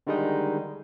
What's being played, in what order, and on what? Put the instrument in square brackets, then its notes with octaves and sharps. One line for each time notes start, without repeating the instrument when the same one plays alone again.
[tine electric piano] D3 D#3 G3 G#3 D#4